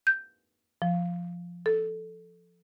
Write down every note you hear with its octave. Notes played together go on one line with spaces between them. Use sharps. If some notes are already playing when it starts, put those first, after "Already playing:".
G6
F3
A4